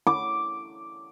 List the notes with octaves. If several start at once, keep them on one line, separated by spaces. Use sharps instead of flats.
D6